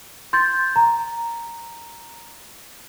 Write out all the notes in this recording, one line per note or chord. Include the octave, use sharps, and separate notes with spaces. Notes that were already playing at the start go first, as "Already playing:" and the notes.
C6 G6 A6
A#5